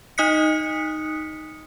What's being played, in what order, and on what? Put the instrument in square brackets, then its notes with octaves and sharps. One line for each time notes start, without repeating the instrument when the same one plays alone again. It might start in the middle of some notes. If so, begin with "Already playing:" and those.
[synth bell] D#4 D#5 D#6 F#6 B6 C#7